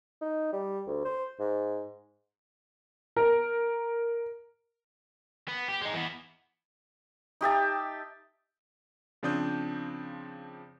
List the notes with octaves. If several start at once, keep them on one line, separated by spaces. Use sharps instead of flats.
D#4
G3
D2
C5
G#2
A#4
B3
G4
G#3 D#4
E3 B3
D#4 G4 E5 A5
C#3 F3 C4 D4 D#6 G6